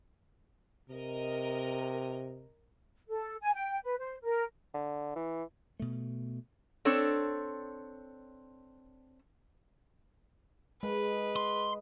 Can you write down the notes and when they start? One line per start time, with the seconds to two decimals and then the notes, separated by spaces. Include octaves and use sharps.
0.89 C3 A#4 D#5
3.09 A4
3.41 G#5
3.54 G5
3.84 B4
3.98 C5
4.23 A#4
4.74 D3
5.16 E3
5.80 B2 A3
6.85 C4 D4 A4 C#5
10.83 G#3 B4
11.36 C6